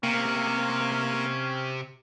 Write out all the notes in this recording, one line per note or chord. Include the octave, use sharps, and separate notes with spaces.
C3 A#3 C#4